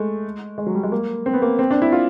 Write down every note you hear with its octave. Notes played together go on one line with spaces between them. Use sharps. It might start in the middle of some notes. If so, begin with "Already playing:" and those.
Already playing: G#3 A3
G#3
F#3
G3
G#3
A#3
C4
B3
A#3
C4
D4
E4
F4